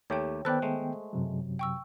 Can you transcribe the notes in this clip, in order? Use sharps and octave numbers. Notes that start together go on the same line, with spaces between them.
D#2 A3 G4 C#5 G5
D#3 B3 A4 B4 C5 D5 G5 F#6
G#3 A3
F#2 C3 F#3
G5 C#6 E6